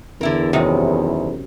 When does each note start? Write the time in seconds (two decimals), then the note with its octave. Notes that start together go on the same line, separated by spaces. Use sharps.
0.21 E2 D3 E4 A#4
0.53 C2 F#2 C3 D#3 F#5